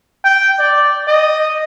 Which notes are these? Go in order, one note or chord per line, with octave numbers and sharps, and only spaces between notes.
G5
D5
D#5